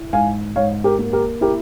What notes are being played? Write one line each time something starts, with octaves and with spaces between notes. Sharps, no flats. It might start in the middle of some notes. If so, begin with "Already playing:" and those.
Already playing: E4
G#2 F5 G#5
G#2 C#5 F5
G4 A#4
A#3
G4 A#4
E4 G4 A#4